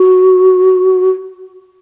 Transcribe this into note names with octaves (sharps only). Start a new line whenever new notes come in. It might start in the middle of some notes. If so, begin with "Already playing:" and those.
Already playing: F#4